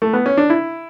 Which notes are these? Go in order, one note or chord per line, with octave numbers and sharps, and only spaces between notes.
A3
B3
C#4
D4
E4